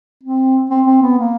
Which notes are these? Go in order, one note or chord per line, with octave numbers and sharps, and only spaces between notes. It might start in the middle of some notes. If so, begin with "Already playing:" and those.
C4
C4
C4
B3
A#3